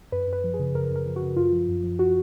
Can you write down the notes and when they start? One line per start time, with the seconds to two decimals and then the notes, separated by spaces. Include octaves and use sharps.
0.12 F#2 B4
0.28 F#2
0.33 B4
0.44 F3
0.54 G#4
0.59 C#3
0.75 F#2 A#4
0.90 F#2
0.96 A#4
1.06 F3
1.16 F#4
1.22 C#3
1.36 F#2 F4
1.53 F3
1.69 F#2
1.84 F3
1.99 F#4